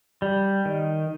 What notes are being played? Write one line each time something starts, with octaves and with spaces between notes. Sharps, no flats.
G3
D#3